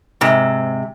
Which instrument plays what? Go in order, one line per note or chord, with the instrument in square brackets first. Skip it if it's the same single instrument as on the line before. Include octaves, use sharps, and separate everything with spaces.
[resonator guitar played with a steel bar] G#2 C3